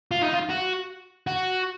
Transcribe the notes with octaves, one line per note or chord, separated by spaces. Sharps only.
F4
D#4
F4
F#4
F#4